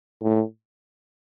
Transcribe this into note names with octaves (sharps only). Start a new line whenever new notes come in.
A2